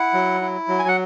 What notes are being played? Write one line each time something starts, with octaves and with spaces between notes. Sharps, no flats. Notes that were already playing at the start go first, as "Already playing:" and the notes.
Already playing: E4 F#5
F#3
E4
F#3
G#5
F#5